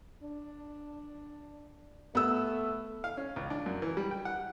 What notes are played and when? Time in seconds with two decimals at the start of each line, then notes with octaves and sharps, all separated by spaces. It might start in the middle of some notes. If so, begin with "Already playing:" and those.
0.23 D4
2.15 A3 B3 E6
3.04 F5
3.17 C#4
3.36 C#2
3.50 D4
3.66 F#2
3.82 E3
3.97 G3
4.11 G5
4.25 F#5